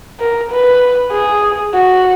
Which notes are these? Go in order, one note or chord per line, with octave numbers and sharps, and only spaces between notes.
A#4
B4
G#4
F#4